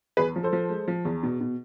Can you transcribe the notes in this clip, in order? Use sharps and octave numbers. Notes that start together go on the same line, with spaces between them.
E2 G#4 B4
F3
A4 C5
F3
G#3
F3
E2
B2
B2